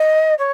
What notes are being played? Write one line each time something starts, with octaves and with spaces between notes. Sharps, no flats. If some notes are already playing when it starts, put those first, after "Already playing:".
Already playing: D#5
C#5